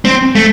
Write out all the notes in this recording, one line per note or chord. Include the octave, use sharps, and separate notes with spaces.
C4
A3